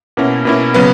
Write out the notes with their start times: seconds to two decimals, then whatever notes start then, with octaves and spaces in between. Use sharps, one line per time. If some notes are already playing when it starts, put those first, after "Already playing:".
0.17 B2 A#3 C#4 E4
0.45 B2 A#3 C#4 E4
0.74 C#3 F#3 B3